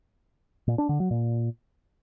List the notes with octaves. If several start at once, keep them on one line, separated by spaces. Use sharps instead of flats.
A#2
D4
D3
F#3
A#2